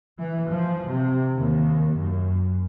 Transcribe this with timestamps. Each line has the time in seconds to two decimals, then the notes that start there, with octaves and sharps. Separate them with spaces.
0.19 E3
0.50 F3
0.88 C3
1.37 D#2
1.97 F#2